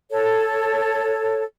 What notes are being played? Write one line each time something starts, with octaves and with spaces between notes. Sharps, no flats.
A4 C#5